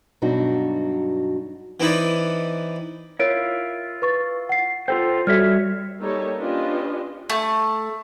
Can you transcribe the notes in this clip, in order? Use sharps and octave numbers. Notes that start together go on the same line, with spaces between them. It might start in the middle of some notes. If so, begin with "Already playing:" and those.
G2 B2 F#3 D4 D#4 F#4
E3 C4 D#4 E4 B4 D5
E4 F4 A#4 C#5 D7
B4 C#6 A6
F#5 C7
F4 A4 C5 G5
G3 F#4 A4 C#5 E5 F6
G3 A#3 D#4 G4 A4 C#5
C#4 D4 F4 G4 B4 D#5
A3